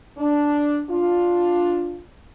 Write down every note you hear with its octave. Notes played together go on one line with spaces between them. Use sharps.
D4
D4 F4